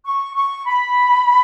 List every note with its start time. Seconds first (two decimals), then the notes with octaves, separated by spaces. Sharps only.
0.05 C#6
0.34 C#6
0.65 B5